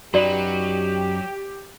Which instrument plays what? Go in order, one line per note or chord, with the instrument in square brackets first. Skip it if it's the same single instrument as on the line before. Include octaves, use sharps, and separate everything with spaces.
[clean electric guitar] F#2 D#4 B4 [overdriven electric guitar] F#3 [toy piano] F#4 D5 [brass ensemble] G4